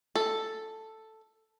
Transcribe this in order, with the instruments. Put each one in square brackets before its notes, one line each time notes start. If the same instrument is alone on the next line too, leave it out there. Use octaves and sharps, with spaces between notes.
[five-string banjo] A4